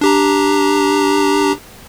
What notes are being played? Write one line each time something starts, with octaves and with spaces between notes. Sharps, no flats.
D4 G4 A#5